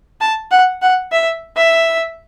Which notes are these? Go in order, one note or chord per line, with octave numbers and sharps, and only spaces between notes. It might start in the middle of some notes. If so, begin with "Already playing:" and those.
A5
F#5
F#5
E5
E5